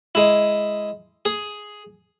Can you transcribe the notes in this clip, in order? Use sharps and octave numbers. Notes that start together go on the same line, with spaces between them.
G#3 E4
G#4